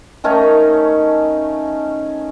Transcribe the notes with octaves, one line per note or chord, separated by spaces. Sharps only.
D#3 A3 C#4 D#4